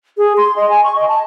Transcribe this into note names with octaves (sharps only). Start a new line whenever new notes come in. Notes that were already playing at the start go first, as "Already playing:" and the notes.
G#4
C6
D#5
G#5
C#6
D#5
A5